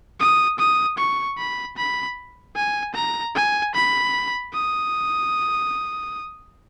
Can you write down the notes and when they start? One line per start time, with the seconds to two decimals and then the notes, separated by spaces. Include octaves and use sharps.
0.20 D#6
0.59 D#6
0.98 C#6
1.38 B5
1.77 B5
2.56 G#5
2.95 A#5
3.35 G#5
3.75 B5
4.53 D#6